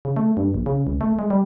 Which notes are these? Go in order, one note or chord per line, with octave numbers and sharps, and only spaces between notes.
C#3
A3
G2
A#1
C#3
C#2
A3
G#3
G3